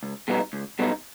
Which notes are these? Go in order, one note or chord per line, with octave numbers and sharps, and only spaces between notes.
C#2
B2 G3 B3 D#4
C#2
B2 G3 B3 D#4